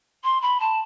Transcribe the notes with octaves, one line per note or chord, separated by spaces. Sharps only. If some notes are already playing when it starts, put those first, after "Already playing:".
C6
B5
A5